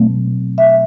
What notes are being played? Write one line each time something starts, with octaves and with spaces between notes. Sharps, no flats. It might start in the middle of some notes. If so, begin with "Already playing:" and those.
Already playing: B2 F#3 A3 C4
E5